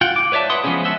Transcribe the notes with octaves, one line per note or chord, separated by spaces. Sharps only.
F4 F#5 G5
D6
B4 C#5 D5 E5 A5
B4 F#5 C6 D#6
F3 G#3 B3 C#4 G#4
D#5 E5 F#5 A5 E6